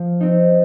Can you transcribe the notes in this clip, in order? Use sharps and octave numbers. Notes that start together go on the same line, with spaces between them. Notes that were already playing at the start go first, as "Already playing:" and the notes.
Already playing: F3
C4 D#4